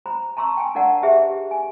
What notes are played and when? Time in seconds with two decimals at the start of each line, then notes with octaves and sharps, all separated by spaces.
0.06 C5 A#5 B5
0.37 A5 A#5 C6 C#6 E6
0.57 G5 G#5
0.75 D4 A#4 D5 F#5 A5 A#5
1.03 G4 G#4 B4 C5 E5
1.51 G#5